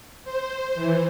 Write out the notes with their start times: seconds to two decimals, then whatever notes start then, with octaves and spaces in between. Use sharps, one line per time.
0.25 C5
0.75 E3